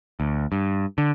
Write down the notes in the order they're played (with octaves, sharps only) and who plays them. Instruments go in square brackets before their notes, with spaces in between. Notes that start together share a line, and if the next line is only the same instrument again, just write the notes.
[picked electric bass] D2
G2
D3